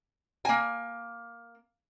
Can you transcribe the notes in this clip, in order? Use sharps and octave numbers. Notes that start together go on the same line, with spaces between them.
A#3 G#5